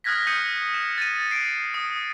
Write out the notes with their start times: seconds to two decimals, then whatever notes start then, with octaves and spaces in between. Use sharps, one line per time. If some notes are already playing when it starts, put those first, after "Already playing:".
0.04 D#6 F6 F#6 G#6 A#6 B6
0.27 D#6 F6 G6 C#7 D#7
0.74 C#7 E7
0.98 A6 D#7
1.31 C7 D7
1.74 D#6